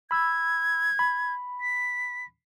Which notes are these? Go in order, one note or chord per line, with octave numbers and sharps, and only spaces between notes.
B5 E6 G#6
B5
B6